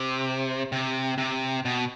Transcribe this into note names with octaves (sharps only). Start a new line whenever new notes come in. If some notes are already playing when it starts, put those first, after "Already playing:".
Already playing: C3
C3
C3
B2